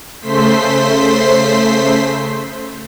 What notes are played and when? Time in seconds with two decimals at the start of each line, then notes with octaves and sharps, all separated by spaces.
0.19 C#3 A3 C5 C6 B6